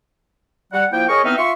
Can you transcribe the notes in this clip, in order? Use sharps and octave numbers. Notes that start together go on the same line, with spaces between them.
G3 F#5
F3 A#3 E4 G5
G#4 A#4 C#5 D#5 C#6
E3 B3 C4 D#4 E5 F6
F4 E5 C6 C#6